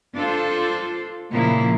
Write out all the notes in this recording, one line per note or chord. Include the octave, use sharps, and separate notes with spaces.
D4 F4 A4 C5
A#2 C#3 F3 A#3 E4